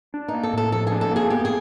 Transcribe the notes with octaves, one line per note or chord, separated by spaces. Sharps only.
D4
D#4
A#3
A4
A2 A4
F3 A4
D4 G#4
A4
A#3
G#4
B3 G4
G#4